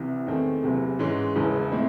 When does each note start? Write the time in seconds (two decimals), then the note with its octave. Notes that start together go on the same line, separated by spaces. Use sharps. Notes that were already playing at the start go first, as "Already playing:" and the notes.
Already playing: C2 C3 E3
0.27 E2 D#3 A3 C4
0.63 F#1 E2 C3
0.99 G#2 E3 G#3 C#4
1.36 E1 E2 C#3 E3
1.72 A2 E3 G#3 C4 E4